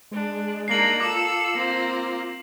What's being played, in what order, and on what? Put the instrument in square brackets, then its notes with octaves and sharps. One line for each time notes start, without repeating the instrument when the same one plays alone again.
[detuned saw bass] G#3 [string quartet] D4
[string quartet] A#3 D4 D#4 [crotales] C7 F#7
[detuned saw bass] F4 [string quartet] A4 E6 [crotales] D6
[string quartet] A#3 C4